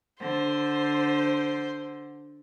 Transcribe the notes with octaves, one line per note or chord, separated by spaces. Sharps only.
D3 C5